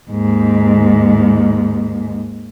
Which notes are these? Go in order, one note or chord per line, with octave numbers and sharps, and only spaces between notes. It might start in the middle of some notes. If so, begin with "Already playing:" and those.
D#2 G#2